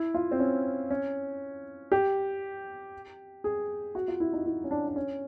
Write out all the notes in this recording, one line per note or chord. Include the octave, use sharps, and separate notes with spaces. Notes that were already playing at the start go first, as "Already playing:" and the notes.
Already playing: E4
F4
C4
C#4
C#4
G4
G#4
F#4
F4
E4
D#4
E4
C#4
D4
D4
C#4